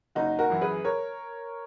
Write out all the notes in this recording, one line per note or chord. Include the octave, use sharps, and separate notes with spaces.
F#1 D#4 F#4
F#4 A#4
F#2 E3
G#4 B4
A#4 C#5